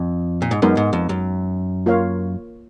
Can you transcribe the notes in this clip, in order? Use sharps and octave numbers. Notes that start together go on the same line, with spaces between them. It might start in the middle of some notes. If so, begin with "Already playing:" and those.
Already playing: F2
A#2
G#2
F#2 G#3 B3 D#4 A#4
G#2
F2
F#2
A#3 F4 A#4 C#5 F5